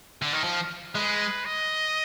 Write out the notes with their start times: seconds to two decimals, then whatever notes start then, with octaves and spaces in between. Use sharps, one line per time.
0.22 D3
0.33 D#3
0.44 F3
0.95 G#3 B4
1.45 D#5